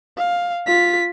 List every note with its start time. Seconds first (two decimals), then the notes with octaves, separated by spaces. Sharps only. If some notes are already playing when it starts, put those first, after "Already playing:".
0.18 F5
0.67 F4 B6